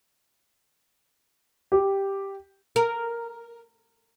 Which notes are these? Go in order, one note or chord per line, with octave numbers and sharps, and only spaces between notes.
G4
A#4